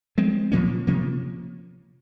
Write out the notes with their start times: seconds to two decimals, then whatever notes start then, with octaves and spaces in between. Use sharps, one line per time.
0.18 F3 G#3 C4
0.52 A#2 F3 A#3 C#4
0.87 C3 F3 A#3 C#4